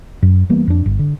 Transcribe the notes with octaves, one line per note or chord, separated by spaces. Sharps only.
F#2
E3 G3 A#3 B3
F2 D4
G1
D3